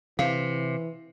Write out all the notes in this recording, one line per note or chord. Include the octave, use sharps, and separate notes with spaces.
C3 E3 F5